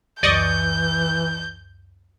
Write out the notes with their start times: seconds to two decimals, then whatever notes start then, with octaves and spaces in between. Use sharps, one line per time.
0.23 C#2 F#2 E3 D5 D#5 C#6 G6